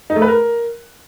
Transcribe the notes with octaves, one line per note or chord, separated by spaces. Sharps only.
D#4
A3
B4
A#4